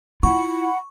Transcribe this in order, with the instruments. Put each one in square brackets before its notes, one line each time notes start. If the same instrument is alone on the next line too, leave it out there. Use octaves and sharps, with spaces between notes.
[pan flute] E4 [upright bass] F4 [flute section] F#5 B5 [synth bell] C#6